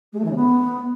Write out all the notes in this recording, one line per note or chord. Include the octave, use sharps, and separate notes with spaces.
G#3
A3
E3
C#3
B3